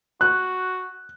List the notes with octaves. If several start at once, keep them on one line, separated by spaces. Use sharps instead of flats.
F#4 F#6